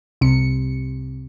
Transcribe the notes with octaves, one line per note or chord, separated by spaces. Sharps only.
C2 C3 C#7